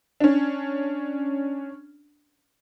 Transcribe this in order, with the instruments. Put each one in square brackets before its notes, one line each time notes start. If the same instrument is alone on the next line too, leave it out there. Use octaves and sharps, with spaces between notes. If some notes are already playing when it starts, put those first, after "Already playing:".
[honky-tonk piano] C#4 D4